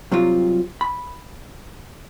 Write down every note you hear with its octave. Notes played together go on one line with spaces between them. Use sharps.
C3 F#3 G3 C4 F4
B5